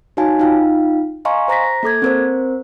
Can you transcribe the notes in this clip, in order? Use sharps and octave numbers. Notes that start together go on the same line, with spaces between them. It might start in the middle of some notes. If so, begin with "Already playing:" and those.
D#4 F#4 C#5 F5 G#5 A5
D#4 F4 F5 G5
D#5 F5 G#5 A#5 C6 C#6
C5 A#5 A#6 B6
A#3 A4 D6 G#6
C4 A#4 C5